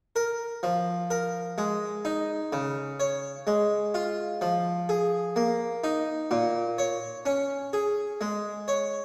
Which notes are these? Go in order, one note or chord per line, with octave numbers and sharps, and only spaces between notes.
A#4
F3
A#4
G#3
D#4
C#3
C#5
G#3
F4
F3
G#4
A#3
D#4
A#2
C#5
C#4
G#4
G#3
C#5